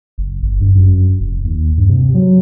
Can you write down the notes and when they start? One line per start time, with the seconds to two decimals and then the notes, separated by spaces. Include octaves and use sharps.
0.18 F#1
0.43 G1
0.61 G2
0.75 F#2
1.20 F1
1.44 D#2
1.78 G2
1.89 C3
2.14 F#3